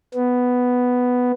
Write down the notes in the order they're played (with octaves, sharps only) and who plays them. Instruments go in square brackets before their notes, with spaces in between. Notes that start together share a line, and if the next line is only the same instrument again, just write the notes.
[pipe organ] B3